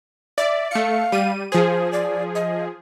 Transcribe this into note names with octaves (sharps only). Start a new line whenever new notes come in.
D5 E5
A3 F5 C#7
G3 D#7
F3 G#4 C5
D5
D#5